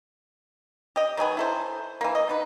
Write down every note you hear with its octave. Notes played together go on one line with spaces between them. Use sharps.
G4 D#5
D#3 F#3 G#4 B4
E4 A4 C5
E3 A#3
D#5
B2 D#4 B4